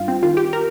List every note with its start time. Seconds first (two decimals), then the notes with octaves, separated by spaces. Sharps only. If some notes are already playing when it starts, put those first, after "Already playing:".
Already playing: G2 F4
0.08 C4
0.23 D#3 F4
0.37 G4
0.53 A#4